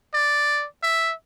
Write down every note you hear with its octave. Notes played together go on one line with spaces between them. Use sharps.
D5
E5